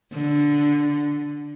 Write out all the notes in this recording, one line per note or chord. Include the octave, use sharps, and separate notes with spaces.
D3